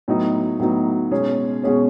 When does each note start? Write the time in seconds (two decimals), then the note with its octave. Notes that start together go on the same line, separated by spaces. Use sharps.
0.08 A2 F#3 B3 D#4
0.59 A2 F#3 B3 D#4
1.11 B2 G#3 C#4 G#4 C#5
1.63 B2 G#3 C#4 G#4 C#5